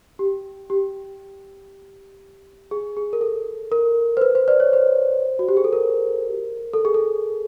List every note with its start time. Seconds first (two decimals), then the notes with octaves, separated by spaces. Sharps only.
0.19 G4
0.70 G4
2.71 G#4
2.97 G#4
3.13 A#4
3.21 A4
3.72 A#4
4.17 C5
4.22 B4
4.35 C5
4.48 C5 D5
4.60 C#5
4.73 C5
5.39 F#4
5.48 G4
5.57 G#4
5.64 A4
5.73 A#4
6.73 A4
6.85 G#4
6.94 A4